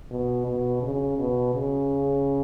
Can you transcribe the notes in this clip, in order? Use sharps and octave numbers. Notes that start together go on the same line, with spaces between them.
B2
B2
C#3
B2
C#3